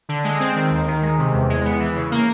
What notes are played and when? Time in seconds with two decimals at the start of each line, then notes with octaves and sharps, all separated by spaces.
0.09 D3
0.24 G#3
0.40 C4
0.56 D#3
0.71 D#2
0.87 D#3
1.02 G#3
1.18 C3
1.34 E2
1.49 G#3
1.65 B3
1.80 E3
1.96 C#3
2.11 A#3